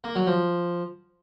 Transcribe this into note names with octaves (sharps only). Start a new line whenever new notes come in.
A#3
F#3
F3